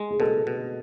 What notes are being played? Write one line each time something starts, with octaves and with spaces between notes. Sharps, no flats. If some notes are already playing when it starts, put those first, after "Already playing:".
Already playing: G#3
G#4
B2 A4
B2